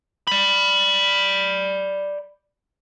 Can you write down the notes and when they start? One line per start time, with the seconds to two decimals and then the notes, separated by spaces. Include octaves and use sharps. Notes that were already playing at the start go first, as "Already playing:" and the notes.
0.27 D5 B5